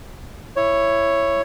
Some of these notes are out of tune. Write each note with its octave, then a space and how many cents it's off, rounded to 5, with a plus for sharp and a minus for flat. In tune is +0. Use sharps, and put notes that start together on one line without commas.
E4 +15 C#5 +0